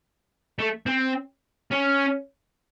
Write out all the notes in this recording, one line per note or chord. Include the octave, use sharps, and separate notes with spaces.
A3
C4
C#4